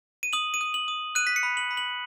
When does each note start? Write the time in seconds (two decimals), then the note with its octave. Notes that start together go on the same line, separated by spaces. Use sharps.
0.23 D#7
0.33 D#6 F#7
0.54 D#7
0.61 D#6
0.74 F#7
0.88 D#6
1.15 F#6 D#7
1.27 B6
1.36 C#7
1.43 B5
1.57 F#7
1.71 B5
1.77 F#7